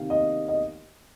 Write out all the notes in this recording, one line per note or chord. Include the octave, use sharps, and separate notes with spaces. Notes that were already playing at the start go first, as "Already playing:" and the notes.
Already playing: C3 D#3 A#3 F5
D#5
D#5